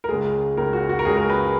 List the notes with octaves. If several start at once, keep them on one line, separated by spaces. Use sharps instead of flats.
A#4
C#2 C#3 G#3 G#4
C#2 C#3 G#3 A#4
F#4
F#4
A#4
C#2 C#3 G#3 G#4
A#4
B4